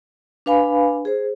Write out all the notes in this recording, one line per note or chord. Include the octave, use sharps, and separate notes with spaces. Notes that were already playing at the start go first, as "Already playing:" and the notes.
D4 B4 F5 G#5 B5
G#4 C5